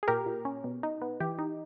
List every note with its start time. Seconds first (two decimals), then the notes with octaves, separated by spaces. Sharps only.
0.03 G#4
0.08 A#2 G4 A#4
0.26 A#2
0.45 C#4
0.64 B2
0.83 D#4
1.02 B3
1.20 E3 G4
1.39 D#4